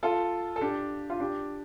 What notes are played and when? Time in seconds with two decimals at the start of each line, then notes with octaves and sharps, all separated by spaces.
0.03 F4 A4
0.56 A4
0.61 D4 G4
1.10 F4
1.20 D4 G4